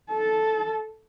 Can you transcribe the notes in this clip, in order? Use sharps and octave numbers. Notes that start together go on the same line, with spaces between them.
A4 A5